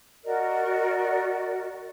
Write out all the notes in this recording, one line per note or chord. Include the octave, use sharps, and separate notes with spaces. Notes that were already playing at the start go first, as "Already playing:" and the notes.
F#4 A#4 D5 D#5